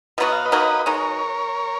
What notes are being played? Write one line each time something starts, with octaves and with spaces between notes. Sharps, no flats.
B2 F#3 B3 F#4 D#5
F5
B4 D#5
F#3 A#3 D#4 F#4
B2 G#3 D#4 F#4 A#4 C#5